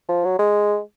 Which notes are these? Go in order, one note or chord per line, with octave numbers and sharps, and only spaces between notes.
F3
F#3
G#3